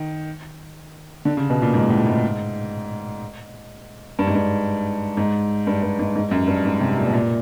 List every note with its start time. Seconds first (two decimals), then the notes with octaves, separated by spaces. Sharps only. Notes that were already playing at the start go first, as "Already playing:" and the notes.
Already playing: D#3
1.25 D3
1.37 C#3
1.50 B2
1.62 A#2
1.74 G#2
1.90 A2
2.07 G#2
4.19 G2
4.27 G#2
4.35 G2
5.17 G#2
5.67 G2
5.83 G2
5.99 G#2
6.16 G#2
6.31 F#2
6.47 G2
6.65 G#2
6.81 C3
6.98 A#2
7.07 B2
7.13 A#2